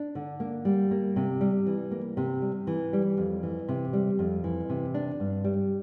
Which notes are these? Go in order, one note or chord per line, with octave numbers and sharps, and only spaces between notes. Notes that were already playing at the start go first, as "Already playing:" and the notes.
Already playing: D4
D3
A#3
G3
A#3
C3
G3
E3
A#3
C3
G3
E3
G3
F2
E3
C3
G3
F2
E3
C3
D4
G2
G3